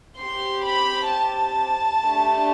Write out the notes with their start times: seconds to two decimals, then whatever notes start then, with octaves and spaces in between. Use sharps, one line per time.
0.19 C4 G4 C6
0.66 B5
1.12 A5
2.04 A3 D4 G4